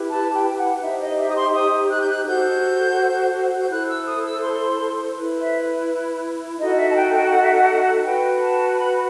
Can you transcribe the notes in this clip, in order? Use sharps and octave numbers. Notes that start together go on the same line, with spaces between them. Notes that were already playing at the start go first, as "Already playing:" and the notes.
Already playing: E4 G4 B4
A5
G5
G5
F#5
D#4 G4 C5 E5
D#5
E5
D#6
C6
D#6
F#6
G6
F#6
F#4 A4 C5 G6
G6
E4 A4 C5 F#6
E6
D#6
E6
C6
E4 B4
E5
D#4 F#4 A4 D#5
E5
A5
G5
G5
F#5
E5
F#5
F#4 B4 G5
A5
B5